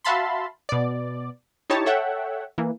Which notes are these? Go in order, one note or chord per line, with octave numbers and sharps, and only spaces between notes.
F#4 E5 F5 A5 B5 C6
B2 D5
D#4 E4 G4 C#5 A5
A4 C#5 E5 F#5 G5
E3 A#3